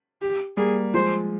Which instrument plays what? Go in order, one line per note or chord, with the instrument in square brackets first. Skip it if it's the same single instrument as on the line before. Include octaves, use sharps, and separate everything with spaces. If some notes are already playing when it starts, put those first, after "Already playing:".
[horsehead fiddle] G4
[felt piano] G3 A#3 [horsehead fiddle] G#4
[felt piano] F3 G#3 [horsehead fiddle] C5